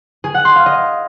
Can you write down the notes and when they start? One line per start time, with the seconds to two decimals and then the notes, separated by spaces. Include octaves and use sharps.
0.24 G#4
0.34 F#5
0.45 C6
0.55 F5
0.66 D#5